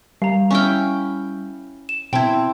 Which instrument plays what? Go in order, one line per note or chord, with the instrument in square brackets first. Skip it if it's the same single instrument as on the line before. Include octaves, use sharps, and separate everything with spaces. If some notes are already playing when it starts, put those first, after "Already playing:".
[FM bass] G3 [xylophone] F5 A#5
[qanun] C#4 E4 G5 [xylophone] C#6 F6
[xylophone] E7
[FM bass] B2 [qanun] C4 E4 [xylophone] G5 A5 G#6